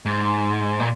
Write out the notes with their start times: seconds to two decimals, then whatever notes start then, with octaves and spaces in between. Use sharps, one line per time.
0.06 G#2
0.80 A#2